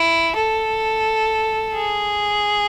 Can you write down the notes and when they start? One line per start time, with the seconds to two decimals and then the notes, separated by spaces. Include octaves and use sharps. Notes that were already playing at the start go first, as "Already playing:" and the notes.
Already playing: E4
0.36 A4
1.75 G#4